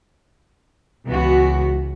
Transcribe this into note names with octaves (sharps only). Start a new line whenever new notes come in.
C#2 E3 B3 F#4